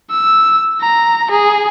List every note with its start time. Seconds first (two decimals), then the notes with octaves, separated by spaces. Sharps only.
0.11 E6
0.81 A#5
1.31 G#4